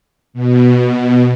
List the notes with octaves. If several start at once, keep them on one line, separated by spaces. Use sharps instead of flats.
B2